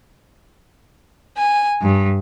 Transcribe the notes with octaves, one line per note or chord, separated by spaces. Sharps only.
G#5
G2